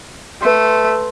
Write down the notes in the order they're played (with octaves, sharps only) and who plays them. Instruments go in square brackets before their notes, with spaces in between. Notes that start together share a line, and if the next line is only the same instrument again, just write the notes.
[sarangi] A3 [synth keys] B4 C6